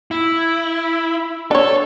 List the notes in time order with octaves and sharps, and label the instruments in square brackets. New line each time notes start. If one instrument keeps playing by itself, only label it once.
[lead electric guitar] E4
[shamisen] D4 C#5 [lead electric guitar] A4